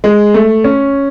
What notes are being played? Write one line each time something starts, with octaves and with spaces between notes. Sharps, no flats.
G#3
A3
C#4